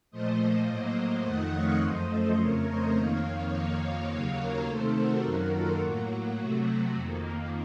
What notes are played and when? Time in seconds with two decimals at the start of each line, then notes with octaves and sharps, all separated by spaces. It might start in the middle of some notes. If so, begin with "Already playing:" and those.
0.11 A#2 F3 A3 C5 D#5
0.68 A2 F#3 A#3
1.24 F2 D#3 A3 D#5 F#5
1.53 C#5 F5
1.81 F#2 F3 A3 C5 D#5
2.10 A4 C5
2.38 F2 C#3 A3 A#4 C#5
2.67 C5 D#5
2.95 F2 D#3 A#3 C#5 F5
3.53 F2 D#3 A#3 C#5 F5
4.10 D#2 C#3 F#3 A#3 C#5 F5
4.38 A#4 C#5
4.66 C3 D#3 A3 A4 C5
4.95 F#4 A#4
5.23 F#2 D#3 F#3 A#3 F#4 A#4
5.52 F4 A4
5.81 A2 F#3 A#3 F#4
6.38 C3 F#3 A3
6.94 F2 D#3 A#3